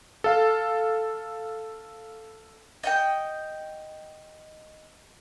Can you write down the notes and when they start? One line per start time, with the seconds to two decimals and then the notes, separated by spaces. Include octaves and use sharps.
0.24 A4 F5
2.83 D#5 F#5 G5